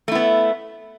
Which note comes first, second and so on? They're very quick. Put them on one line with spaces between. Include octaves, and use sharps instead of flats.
A3 E4 B3